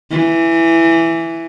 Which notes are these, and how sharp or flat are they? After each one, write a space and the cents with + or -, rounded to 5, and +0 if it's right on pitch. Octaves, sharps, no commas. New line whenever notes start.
E3 +5